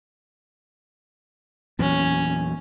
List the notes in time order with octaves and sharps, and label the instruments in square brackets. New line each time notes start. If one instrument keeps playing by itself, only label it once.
[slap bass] E2 A#2 F#3 [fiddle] C#4